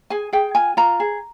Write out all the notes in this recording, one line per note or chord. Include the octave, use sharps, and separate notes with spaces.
G#4 G#5
G#4 G5
F4 G#5
F4 A#5
G#4